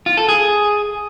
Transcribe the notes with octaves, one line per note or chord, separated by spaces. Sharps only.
F4
A4
G#4